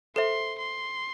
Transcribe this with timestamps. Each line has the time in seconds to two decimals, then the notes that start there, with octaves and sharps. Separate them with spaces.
0.16 A4 C5 E5 C6
0.58 C6